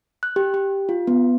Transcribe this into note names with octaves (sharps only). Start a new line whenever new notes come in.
F#6
G4
G4
F4
B3